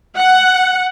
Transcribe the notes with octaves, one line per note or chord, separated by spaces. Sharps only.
F#5